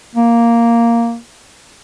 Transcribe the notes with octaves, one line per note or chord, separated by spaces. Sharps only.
A#3